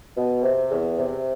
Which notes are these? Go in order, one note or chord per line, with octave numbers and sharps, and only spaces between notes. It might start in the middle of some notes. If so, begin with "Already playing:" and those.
B2
C3
E2
C3